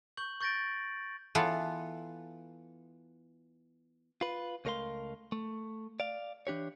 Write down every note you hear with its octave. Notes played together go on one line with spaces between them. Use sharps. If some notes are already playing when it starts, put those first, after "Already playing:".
C#6 G6 F#7
C#6 G6 A6 A#6 D7
E3 B3 F4 A4
F4 B4
C#2 A3 A#4 C#5 F5 C6
A3
D5 F5
E3 D4 G4 C#5